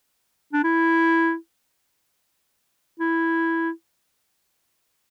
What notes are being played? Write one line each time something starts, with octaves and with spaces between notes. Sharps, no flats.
D4
E4
E4